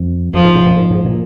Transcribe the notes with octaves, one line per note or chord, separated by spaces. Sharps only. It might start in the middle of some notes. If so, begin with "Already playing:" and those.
Already playing: F2
F2 F3
G#2
G#2 C3
F2 A#2
G#2
G#2
A#2